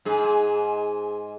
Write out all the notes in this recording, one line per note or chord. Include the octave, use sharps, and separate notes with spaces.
G#2 G#4